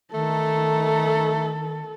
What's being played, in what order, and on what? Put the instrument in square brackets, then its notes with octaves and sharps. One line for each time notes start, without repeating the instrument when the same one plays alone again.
[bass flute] D#3 [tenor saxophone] A3 [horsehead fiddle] A4